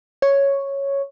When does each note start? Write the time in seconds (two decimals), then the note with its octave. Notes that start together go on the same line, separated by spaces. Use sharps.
0.22 C#5